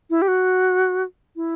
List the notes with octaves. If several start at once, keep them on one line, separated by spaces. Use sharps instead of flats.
E4
G4
F#4
E4